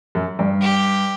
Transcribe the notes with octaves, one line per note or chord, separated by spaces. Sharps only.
F#2
G2
G4